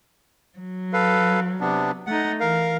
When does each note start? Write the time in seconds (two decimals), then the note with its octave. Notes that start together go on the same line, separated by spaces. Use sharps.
0.58 F#3
0.93 A4 B4 F5
1.60 C3 B3 D4
2.07 A3 D#4 F#5
2.40 E3 A#4 F5